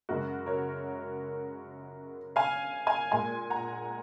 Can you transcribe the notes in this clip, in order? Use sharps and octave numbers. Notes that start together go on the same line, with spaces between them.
F#2 C#3 G#3 F#4 A#4
A#4 C#5
F5 G#5
F5 G#5
A#2 G#3 G#5 C6
F#5 A#5